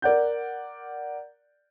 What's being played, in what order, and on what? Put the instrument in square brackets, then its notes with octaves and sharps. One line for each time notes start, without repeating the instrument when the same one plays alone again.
[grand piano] A#4 D5 F#5 G6